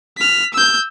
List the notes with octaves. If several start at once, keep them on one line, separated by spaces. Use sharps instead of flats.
F6 B6
E6 G6